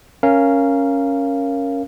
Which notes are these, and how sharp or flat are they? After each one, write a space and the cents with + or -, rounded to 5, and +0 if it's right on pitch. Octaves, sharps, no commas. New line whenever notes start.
C#4 +0 A#4 +0 F5 -15